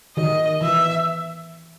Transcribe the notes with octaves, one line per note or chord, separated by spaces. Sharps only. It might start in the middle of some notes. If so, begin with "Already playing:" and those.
D#3 D#5
E3 E5